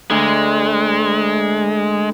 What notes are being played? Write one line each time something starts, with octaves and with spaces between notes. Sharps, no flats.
D2 G#3